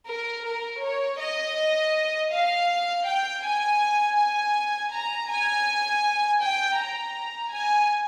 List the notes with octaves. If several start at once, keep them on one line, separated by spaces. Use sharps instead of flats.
A#4
A#4
C#5
D#5
F5
G5
G#5
G#5
A#5
G#5
G5
A#5
G#5